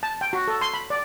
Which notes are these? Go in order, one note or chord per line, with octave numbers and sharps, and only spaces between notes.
A5
G5
F#4
A4
C6
B5
D5